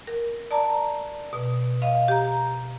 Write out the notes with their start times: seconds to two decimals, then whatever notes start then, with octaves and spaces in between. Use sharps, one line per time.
0.07 A#4
0.51 D5 A5 A#5
1.33 B2
1.82 D#5 F5
2.08 G4 A#5